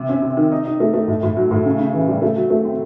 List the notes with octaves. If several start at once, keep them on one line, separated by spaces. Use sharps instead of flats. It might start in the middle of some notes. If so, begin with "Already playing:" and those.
Already playing: C3
C#4
C3
D#3
D#4
D#4
A3
A3
A2
A2
F#3
A2
C#3
C#3
E3
G3
A3
F#3
A3
C4